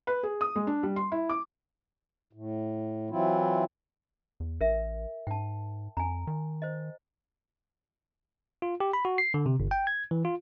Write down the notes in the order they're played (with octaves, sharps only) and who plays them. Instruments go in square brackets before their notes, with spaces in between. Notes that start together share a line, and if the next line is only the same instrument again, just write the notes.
[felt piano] B4
G#4
D#6
G#3
D4
G3
C6
E4
D6
[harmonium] A2
E3 F#3 C4 E4 F4
[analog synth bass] E2
[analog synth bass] A1 [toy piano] A#4 E5
[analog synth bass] G#2 [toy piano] G5 A5
[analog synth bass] F2 [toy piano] G#5 A#5
[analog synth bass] D#3
[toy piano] C5 D#5
[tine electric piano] F4
G4
B5
F#4
C7
D3
C3
G1
G5
G#6
E3
F4